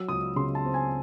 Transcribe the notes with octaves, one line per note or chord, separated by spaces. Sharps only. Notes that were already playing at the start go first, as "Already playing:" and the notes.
Already playing: F#3 E6
C#2 D#6
C#3 C6
A5
C4
G#5